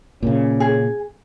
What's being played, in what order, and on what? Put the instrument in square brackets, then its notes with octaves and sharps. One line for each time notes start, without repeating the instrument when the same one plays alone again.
[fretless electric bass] A#2 C#3 [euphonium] C#4
[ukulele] G#4